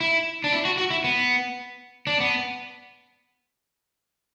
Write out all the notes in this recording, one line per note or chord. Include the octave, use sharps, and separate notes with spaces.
E4
D4
E4
F#4
F#4
E4
B3
D4
B3